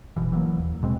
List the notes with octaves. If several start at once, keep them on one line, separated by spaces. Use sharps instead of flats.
F#1 B2 E3
E3 F#3 G3 A#3
D#2
D1 B2 G#3 C4